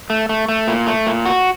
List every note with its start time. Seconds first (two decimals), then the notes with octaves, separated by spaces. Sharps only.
0.10 A3
0.29 A3
0.49 A3
0.68 A#2
0.87 A3
1.07 A#2
1.26 F#4